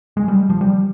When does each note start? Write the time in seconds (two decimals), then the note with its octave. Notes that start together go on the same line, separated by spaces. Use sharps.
0.17 G#3
0.28 G3
0.50 F3
0.61 G3